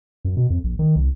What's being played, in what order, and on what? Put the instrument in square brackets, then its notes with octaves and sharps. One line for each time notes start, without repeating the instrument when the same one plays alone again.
[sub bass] F#2
B2
F2
A#1
D#3
C2